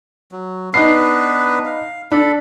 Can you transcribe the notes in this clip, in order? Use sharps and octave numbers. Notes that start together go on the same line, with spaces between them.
F#3
B3 D4 D#4 B4 C7
F5
D4 A4 B5